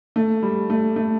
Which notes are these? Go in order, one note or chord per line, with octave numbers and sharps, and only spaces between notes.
A3
G3
A3
A3